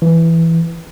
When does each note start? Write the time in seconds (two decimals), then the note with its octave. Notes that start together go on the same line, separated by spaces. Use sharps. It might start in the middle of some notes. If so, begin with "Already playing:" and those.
0.02 E3